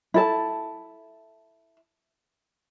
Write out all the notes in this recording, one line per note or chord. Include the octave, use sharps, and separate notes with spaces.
E4 A4 A5